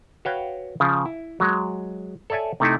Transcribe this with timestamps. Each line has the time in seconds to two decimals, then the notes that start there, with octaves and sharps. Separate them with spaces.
0.25 F#4 B4 C#5 F5 G5
0.80 C#3 F3
1.06 E4
1.40 F#3 G#3
2.30 A4 C#5 D5 E5 G#5
2.60 C3 A3 D#4 E4